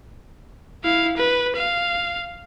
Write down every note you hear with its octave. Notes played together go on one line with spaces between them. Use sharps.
E4 F5
B4
F5